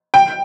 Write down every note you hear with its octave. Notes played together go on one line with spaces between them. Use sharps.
G5